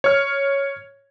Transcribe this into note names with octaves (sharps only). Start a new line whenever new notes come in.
C#5 F6